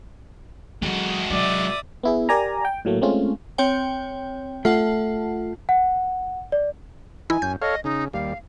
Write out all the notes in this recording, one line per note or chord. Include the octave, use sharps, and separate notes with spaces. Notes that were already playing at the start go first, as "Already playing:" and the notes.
D3 F#3 G#3 F#4
C3 F#3 D5 E5 D#6
B3 E4 G#4
G4 A#4 D5 G#5 A#5
G5
A2 F#3 A3 A#3
G#3 A3 C4 C#4 F4
C4 C#5 G5
A3 F4 F#5 A5
F#5
D5
E3 D#4 E4 G#5
F#2 G6
A4 C#5 D#5 F5
C#3 D#4
D#2 G3 F5